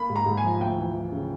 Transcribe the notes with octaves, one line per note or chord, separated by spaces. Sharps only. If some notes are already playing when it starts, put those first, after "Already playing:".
Already playing: A#3 B5
G#2
A#5
G#2
G#5
F3
D2 G5
E3
E3
C#3